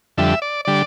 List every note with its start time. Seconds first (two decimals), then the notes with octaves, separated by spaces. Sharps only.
0.18 F2 D3 G3 E5
0.42 D5
0.65 D3 G3 D5